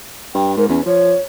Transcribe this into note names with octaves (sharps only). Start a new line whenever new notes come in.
G2 G5
G#2 A#4
E2 C#4
F3 C#5